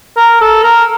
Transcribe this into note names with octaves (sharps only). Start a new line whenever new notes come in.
A#4
A4
A#4